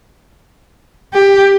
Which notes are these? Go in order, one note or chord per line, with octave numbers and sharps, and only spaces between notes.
G4